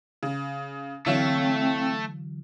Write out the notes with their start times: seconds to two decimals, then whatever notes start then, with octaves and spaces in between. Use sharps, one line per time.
0.23 C#3
1.06 D3 E3 F#3 A3 C4 E4 C#5 F5